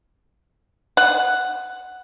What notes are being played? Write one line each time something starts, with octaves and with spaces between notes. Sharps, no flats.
F#5